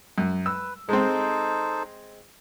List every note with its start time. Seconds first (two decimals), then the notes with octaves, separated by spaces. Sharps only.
0.18 F#2
0.46 B4 E6
0.89 G#3 C4 D#4 A4 C5